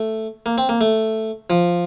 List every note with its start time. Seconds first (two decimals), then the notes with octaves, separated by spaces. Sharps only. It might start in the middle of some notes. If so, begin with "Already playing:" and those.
Already playing: A3
0.46 A#3
0.58 C4
0.69 A#3
0.81 A3
1.50 F3